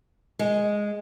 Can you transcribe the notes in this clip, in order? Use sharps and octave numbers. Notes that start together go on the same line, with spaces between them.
G#3